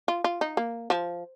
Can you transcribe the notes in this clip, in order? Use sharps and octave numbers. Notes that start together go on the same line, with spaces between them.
F4
F4
D#4
A#3
F3